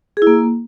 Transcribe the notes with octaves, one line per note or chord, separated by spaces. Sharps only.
G#4
E4
A#3